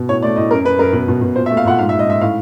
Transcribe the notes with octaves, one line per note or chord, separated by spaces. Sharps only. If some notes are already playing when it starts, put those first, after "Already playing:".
Already playing: B2
A2 C#5
A3 D5
A2 D#5
F#2 A#4
F#2 B4
F#2 A#4
B2 B4
B2
B2
A#2 C5
E5
A3
F5
A#2 F#5
G#2 F5
E5
G#2
D#5
G#2 E5
A2 F5